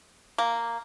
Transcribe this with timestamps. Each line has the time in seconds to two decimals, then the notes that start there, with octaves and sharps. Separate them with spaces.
0.38 A#3